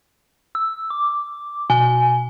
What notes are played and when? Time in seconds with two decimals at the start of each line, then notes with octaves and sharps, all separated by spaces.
0.55 E6
0.90 D6
1.70 B2 G#5